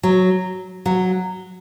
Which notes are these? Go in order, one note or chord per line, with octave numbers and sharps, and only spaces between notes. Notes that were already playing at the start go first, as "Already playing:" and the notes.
F#3
F#3